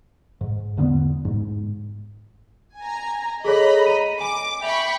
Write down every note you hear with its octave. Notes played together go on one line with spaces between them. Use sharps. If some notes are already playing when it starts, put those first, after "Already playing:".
G#2
E2 D3 A#3 B3
G#2
G#5 A#5
G#4 A4 C#5 D#5 A#5 B5
D#7
G#5 D6
E5 G5 B5 C#6 F7